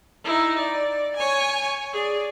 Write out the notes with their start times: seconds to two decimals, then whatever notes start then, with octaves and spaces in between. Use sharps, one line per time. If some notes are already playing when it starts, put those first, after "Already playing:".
0.24 D#4 E4
0.58 D5
1.16 C#5 G#5
1.93 G#4 D5